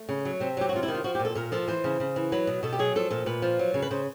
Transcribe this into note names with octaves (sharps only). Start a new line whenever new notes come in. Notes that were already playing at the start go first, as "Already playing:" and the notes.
Already playing: A3
C#3
F#3
C3 C4
F#3 G4
F#4
C3 F4
E4
D#3
F4
F3 F#4
G4
A#2
A4
A#2 A#4
F3 A4
E3 C5
C#3
C#3
E3
F#3 B4
B2
B2 A4
G4
F#3 G#4
F3 A4
A#2 A4
A#2 B4
F3
F#3
C#3
B4
C#3 C5